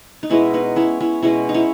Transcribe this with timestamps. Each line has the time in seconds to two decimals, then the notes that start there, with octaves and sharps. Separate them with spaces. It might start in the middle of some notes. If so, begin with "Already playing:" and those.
0.23 D#4
0.30 B2 G#3 B3 C#4 E4
0.54 B3 D#4
0.76 C#4 E4
1.00 C#4 E4
1.22 B2 G#3 B3 C#4 E4
1.49 D#4
1.54 C#4 E4